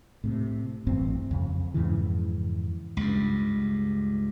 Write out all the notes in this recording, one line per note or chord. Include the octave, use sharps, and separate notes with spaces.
A2 C3
A1 G2 C4
F2 C#3
F2 G#2 C#3 E3
C#2 G2